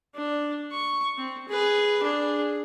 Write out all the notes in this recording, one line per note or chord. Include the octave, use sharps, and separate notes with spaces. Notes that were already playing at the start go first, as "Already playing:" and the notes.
D4
C#6
C4
G#4 B4
D4 G#4